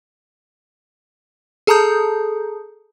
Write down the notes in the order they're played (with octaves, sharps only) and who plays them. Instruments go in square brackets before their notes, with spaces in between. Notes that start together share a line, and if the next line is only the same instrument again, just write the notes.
[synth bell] G#4 A4 A5 A#5 D#6 G6